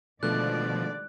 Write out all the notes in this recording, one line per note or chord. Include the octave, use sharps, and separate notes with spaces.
B2 D3 D#3 F3 G#3 A3 D5 F#6